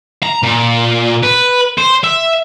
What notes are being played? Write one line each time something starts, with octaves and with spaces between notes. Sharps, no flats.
A#5
A#2
B4
C5
E5